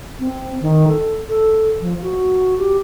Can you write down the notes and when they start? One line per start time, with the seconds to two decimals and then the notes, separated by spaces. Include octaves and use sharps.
0.19 C4
0.61 D#3
0.88 A4
1.29 A4
1.81 F3
2.02 F#4
2.58 G4